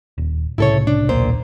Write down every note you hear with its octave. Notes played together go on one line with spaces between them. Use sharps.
D#1
C2 A2 C#3 E4 A4 C#5
D4
D#1 B1 A#2 C5